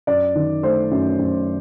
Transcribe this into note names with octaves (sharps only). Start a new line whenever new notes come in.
F#2 D5
D#3
A3 C5
F#2
F#2